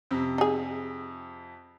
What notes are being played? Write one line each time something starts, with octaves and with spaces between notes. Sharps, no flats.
F2 C3
D#4 G#4